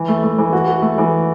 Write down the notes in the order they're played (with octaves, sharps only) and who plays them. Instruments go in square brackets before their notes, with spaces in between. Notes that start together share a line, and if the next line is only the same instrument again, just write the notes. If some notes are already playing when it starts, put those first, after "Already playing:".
Already playing: [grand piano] E3
A3
A3
E3
F#4
F#4
A3
E3